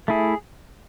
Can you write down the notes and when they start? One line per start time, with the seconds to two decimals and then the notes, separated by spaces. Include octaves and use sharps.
0.08 A3 E4 G#4